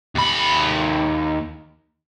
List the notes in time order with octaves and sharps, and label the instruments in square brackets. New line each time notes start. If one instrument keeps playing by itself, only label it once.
[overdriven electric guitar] D#2 B5